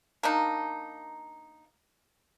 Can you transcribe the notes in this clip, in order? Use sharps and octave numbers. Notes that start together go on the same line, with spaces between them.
A#3 D4 D#4